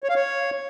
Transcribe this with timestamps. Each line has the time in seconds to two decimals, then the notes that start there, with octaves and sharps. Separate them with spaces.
0.04 C#5
0.09 F5
0.15 C#5